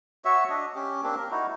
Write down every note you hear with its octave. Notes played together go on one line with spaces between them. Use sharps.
F#4 C#5 E5
D4 D#5
C#4 G4
A#3 C4 D4 G4
A#4
D#4 E4 F#4